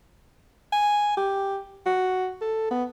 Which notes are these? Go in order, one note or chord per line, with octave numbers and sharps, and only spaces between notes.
G#5
G4
F#4
A4
B3